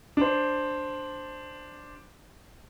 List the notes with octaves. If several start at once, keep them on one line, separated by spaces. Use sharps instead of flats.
D4 C5